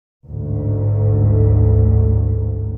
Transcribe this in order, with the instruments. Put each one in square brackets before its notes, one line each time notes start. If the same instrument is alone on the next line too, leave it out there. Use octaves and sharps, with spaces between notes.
[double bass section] A1 D2 G#2